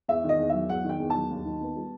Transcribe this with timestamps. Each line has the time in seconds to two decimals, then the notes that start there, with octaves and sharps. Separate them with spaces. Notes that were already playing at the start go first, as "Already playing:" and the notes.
0.08 E2 E5
0.24 D#3 D#5
0.39 E2
0.50 F#3 E5
0.69 E2 F#5
0.85 D#3 G5
1.00 E2
1.10 A5
1.16 F#3
1.31 D#2
1.45 D#3
1.61 B3
1.76 G3